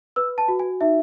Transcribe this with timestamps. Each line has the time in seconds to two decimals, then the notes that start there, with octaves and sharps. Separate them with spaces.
0.16 B4 E6
0.38 A5
0.48 F#4
0.60 G#5
0.81 D#4 E5